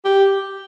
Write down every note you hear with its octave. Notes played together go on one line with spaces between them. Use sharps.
G4